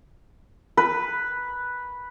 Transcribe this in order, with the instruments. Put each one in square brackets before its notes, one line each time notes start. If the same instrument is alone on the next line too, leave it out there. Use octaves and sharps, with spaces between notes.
[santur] B4